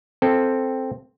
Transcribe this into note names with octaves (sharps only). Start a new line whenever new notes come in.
C4 A4